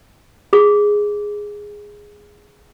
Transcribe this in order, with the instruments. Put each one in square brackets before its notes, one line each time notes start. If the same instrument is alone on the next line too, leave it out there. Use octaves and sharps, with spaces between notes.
[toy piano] G#4 D6